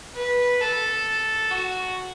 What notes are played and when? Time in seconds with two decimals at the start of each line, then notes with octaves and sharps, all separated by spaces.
0.16 B4
0.61 A4
1.50 F#4